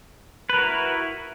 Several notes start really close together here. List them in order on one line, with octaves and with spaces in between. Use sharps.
B4 A#4 F#4 E4